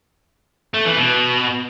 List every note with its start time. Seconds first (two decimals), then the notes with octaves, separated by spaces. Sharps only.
0.74 A3
0.85 E3
0.97 B2